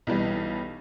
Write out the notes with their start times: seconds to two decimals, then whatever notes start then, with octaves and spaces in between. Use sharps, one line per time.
0.07 B1 E3 G3